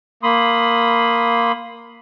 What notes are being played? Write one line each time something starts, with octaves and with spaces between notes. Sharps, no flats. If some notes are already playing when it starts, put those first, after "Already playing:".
A#3 B5 C6 D#6